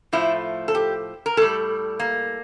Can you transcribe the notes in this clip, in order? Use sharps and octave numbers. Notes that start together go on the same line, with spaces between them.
A2 F3 A3 E4
A4
G4
A#4
A2 G3 A4
A#3